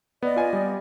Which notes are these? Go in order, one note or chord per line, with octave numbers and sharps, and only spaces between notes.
B3 D5 D#5
F4 G#5
G3